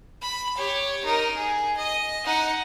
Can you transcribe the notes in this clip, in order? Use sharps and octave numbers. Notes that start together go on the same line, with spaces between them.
B5
G4 C#5
D#4 A#4
G#4
D#5
D#4 F#5